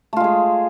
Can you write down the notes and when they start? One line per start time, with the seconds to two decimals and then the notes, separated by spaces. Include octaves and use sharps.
0.13 A3
0.16 F4
0.20 G#3
0.24 G#4